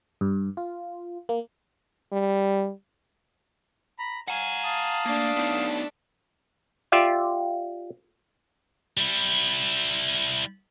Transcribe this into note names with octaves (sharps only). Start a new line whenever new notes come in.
G2
F4
A#3
G3
A#5 B5
F5 F#5 G#5 A#5
F5 A5 D#6
A3 A#3 D4
B3 D#4
F4 G4 D5 E5
G3 E4